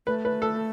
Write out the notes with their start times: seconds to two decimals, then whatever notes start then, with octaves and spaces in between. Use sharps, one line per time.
0.07 A3 B4
0.25 B4
0.42 A4